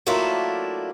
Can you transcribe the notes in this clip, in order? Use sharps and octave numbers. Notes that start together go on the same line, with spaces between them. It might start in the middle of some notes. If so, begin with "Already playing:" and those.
F#3 A3 A#3 D4 E4 F4